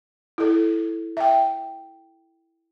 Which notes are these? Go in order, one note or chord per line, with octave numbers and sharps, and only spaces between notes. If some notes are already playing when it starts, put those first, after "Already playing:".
E4 A4
E5 G5